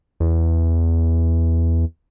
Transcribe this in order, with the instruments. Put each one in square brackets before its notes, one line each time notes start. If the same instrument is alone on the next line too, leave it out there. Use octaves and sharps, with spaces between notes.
[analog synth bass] E2